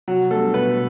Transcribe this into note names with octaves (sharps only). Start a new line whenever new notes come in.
C3 F#3 F#4
G3 A3 B3 D4 G4 A4
B2 B3 B4